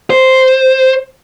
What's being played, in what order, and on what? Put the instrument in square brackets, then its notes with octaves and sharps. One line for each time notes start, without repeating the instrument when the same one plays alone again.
[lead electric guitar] C5